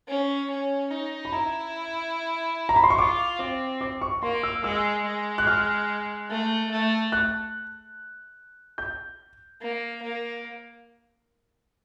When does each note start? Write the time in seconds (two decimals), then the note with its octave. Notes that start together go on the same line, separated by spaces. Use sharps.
0.08 C#4
0.50 C#4
0.91 D#4
1.25 B5
1.32 E4 A#5
2.69 A#5
2.76 B5
2.84 C6
2.90 C#6
2.98 F4 D6
3.39 C4 D6
3.81 D6
4.02 C#6
4.22 A#3 C6
4.43 E6
4.64 G#3 E6
5.05 G#3
5.38 F#6
5.47 F6
6.30 A3
6.71 A3
7.12 F#6
8.78 G6
9.61 A#3
10.02 A#3